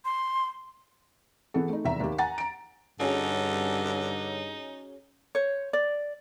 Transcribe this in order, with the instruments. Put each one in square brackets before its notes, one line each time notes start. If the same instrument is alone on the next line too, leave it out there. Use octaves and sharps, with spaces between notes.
[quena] C6
[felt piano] E3 B3 G#4 A4
A3 D#4
F1 E2 E5 A#5
D#2 G4
F#5 G#5 A#5 A6
A#5 D7
[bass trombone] G2 [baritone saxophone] D3 [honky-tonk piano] C#4 F#4 G#4 [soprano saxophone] D#4
[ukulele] C5 C#5
D5